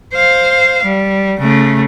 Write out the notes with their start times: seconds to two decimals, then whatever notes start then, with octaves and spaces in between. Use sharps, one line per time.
0.14 C5 F5
0.84 G3
1.40 C#3 A3